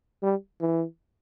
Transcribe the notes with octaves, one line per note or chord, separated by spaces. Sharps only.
G3
E3